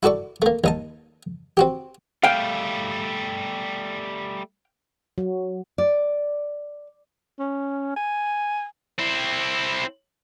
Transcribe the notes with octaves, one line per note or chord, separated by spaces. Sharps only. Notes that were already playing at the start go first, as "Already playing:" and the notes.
E4 F#4 A4 D5 C#6
A3 A#3
D#2 D#4 A5
C4 F#4 G4
G3 A3 F5 G5
F#3
D5
C#4
G#5
C4 E4